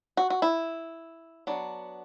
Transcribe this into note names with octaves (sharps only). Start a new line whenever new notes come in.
F#4
F#4
E4
F#3 B3 D4